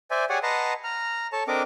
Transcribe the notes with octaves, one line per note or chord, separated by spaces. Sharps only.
C5 D5 E5 G#5
G4 G#4 C#5 D5 F#5 G#5
B4 D#5 F#5 A5 A#5 C6
A#5 F6
A4 C#5 A5
C4 D4 A4 A#4 D#5 D6